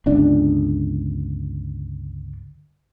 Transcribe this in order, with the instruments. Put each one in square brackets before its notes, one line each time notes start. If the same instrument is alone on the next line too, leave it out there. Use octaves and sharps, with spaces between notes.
[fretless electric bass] G1 C#2 D4